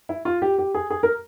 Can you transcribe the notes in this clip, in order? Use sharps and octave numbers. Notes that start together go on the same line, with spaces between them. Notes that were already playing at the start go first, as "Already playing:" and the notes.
E4
F4
G4
G4
G#4
G#4
A#4